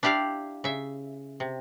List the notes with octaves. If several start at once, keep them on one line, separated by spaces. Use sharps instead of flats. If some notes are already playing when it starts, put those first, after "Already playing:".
D4 E4 G4 D5 F5
C#3 E5
C3